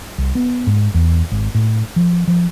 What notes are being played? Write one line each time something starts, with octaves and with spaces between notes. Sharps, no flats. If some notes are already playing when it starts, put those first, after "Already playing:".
C2
B3
G#2
E2
G#1
A2
F3
F3